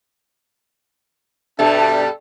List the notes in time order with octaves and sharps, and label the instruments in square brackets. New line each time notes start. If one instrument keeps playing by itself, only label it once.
[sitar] G2 B2 G3 [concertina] D4 [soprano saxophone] A4 [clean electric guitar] E5